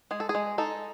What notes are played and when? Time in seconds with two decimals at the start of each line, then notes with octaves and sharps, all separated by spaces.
0.11 G#3 G#4
0.20 A4
0.29 G#4
0.35 G#3
0.58 D#4 A4